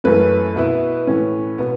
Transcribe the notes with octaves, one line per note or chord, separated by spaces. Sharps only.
F#2 E3 A3 C#4 B4
B2 B3 E4
A2 E3 C#4
B2 B3